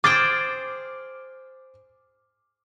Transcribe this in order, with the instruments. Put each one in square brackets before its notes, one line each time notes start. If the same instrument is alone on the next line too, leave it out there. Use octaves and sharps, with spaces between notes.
[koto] G#4 C5 G5 [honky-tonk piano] D6 F6 A6